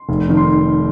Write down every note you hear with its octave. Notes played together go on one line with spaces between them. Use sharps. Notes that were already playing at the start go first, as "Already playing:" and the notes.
Already playing: C6
F1
F2 D#3
C6